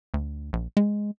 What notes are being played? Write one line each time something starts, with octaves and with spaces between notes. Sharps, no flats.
D2
A#1
G#3